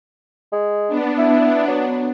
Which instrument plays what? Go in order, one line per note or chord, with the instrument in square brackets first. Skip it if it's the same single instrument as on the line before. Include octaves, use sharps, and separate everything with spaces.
[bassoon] G#3
[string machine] B3 D4
[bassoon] E4
F#3